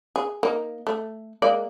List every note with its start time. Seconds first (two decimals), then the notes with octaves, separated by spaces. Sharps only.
0.16 G#4
0.43 A#3 D#4
0.87 A3
1.42 G#3 A#3 D5